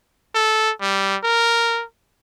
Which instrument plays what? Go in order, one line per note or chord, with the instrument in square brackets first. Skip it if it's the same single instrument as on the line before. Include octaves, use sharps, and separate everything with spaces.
[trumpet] A4
G3
A#4